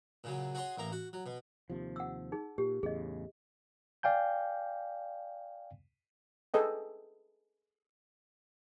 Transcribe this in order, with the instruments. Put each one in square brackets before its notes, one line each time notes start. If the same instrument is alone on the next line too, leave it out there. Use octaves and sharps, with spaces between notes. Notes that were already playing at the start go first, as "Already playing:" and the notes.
[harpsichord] A#2 C#3 F#3
F#4 G#4 C#5 C6
A1 A#3 A#5
F#4
F#3
B2
[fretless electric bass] D#2 C3 F3
[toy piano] F#5 E6
D#4 G#4
[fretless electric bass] A#2 [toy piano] G4
[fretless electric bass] E2 A2 C#3 [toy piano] G#4 D#5
[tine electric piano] D5 F5 G5 G#5 G6
[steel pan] G#4 A4 B4 D#5 G5